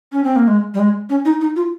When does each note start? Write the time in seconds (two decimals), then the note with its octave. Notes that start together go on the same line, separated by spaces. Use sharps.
0.12 C#4
0.24 C4
0.36 A#3
0.48 G#3
0.74 G3
0.79 G#3
1.10 C#4
1.25 D#4
1.41 D#4
1.56 F4